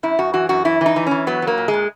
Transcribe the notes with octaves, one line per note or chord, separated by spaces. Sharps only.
F#2 E4
F#2 F#4
E3 F#4
F#2 F#4
E3 E4
E3 D#4
E3
E3 C#4
F#3 B3
F#3
A#3
A#2
G#3
A#2